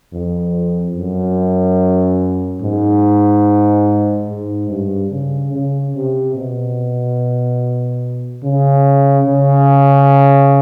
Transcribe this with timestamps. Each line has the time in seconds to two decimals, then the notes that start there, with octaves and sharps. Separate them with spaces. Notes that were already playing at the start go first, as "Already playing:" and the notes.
0.13 F2
0.96 F#2
2.62 G#2
4.28 G#2
4.70 G2
5.11 C#3
5.52 C#3
5.95 C3
6.35 B2
8.43 C#3
9.26 C#3